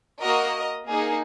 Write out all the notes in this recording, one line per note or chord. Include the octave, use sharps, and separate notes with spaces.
A#3 F#4 A#4 D#5
A#3 D#4 G#4